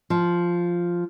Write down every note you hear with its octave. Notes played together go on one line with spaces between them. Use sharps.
F3